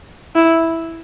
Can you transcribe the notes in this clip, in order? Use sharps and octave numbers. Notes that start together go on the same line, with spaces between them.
E4